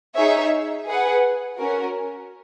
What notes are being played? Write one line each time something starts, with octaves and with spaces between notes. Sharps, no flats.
D#4 G#4 C#5 E5
G#4 B4 F#5
C#4 F#4 A#4